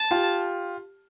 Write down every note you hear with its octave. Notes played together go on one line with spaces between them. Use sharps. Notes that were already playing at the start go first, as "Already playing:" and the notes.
Already playing: A5
F4 G4